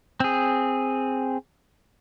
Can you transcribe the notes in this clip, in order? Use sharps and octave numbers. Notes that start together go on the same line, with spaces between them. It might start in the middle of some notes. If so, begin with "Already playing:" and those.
C4 G#4